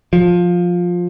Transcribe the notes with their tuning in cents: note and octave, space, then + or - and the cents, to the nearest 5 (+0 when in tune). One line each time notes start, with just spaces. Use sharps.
F3 +15